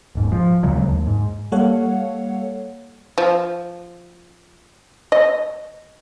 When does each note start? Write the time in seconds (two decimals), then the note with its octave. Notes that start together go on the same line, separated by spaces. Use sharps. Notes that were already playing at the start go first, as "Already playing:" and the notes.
0.15 D#1 G#2
0.32 F3
0.63 D2 C#3 F#3 G#3
0.88 D#2
1.07 G#2
1.52 G3 A#3 A4 C#5 F5 F#5
3.18 F3
5.12 D#5